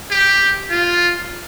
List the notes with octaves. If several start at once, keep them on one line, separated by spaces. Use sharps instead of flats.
G4
F4